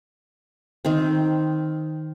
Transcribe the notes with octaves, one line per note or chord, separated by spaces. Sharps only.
D#3 C4